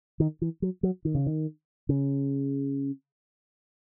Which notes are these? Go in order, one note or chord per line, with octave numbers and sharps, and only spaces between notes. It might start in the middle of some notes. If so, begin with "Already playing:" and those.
D#3
E3
F#3
F#3
D#3
C#3
D#3
C#3